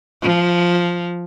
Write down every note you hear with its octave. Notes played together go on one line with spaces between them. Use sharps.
F3